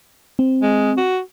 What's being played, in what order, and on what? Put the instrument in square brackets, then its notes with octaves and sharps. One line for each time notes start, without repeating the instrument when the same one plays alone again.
[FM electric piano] C4
[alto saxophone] G#3
F#4